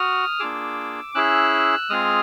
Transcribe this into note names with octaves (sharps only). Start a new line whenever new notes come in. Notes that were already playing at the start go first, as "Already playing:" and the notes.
Already playing: F#4 D#6 F6
A#3 D4 F4 G#4 D6 E6
C#4 E4 G#4 E6 F#6
G#3 C4 F4 G#4 D#6 F6